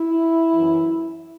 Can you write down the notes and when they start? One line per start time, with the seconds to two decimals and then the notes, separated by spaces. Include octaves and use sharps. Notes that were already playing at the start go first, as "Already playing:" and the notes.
Already playing: E4
0.54 F#2 E3